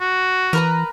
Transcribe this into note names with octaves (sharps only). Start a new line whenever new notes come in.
F#4
E3 A#4 B4 A#5